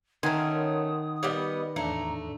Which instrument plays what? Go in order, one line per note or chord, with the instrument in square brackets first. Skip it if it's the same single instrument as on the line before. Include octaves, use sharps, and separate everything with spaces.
[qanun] D#3 [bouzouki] A3 C#4 [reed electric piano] A#4 F#5 C6 [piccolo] D#6
[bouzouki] G3 B3 D#5
[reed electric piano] E2 A2 D4 [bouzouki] A3 [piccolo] A#5